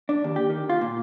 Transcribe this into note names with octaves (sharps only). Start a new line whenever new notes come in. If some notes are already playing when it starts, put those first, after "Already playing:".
D4
D#2
G4
D#3
F4
A#2